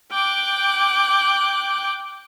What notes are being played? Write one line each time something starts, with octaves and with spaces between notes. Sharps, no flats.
G5 D6 F#6